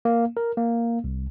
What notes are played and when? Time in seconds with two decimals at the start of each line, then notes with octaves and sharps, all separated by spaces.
0.05 A#3
0.37 A#4
0.57 A#3
1.04 C2